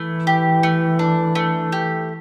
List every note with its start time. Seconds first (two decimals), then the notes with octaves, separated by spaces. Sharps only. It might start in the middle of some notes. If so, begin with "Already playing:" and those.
Already playing: E3 A3 E4
0.27 G4
0.63 A3
0.99 D4
1.35 A3
1.72 G4